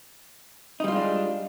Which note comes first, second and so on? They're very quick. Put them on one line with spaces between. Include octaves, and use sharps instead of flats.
D#4 G3 F4 G#3 D4